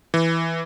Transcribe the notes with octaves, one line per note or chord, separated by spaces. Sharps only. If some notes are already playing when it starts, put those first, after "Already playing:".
E3